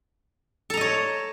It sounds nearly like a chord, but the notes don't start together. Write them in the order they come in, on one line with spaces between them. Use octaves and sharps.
A4 A#5 D#5 C#5